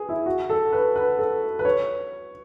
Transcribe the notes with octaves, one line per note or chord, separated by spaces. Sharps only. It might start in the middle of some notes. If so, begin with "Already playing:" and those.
Already playing: G#4 B4
E4
F#4
A4
B4
B4
A4
B4
C#5